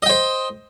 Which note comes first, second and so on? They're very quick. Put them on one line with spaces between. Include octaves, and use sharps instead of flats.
D#5 G5 C5